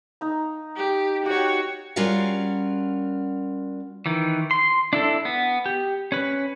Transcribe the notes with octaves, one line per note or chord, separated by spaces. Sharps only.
D#4 A#5
G4
F#4 G4 C#5
G3 C#4 F4 F#4 A#4 F5
D#3 E3
C6
D4 E4 A4
B3
G4
C#4 B4